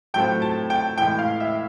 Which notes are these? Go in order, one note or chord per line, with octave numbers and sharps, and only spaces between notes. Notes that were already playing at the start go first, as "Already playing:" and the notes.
A2 F#3 A3 C4 F4 G5
A5
G5
A2 E3 G#3 G5
F5
E5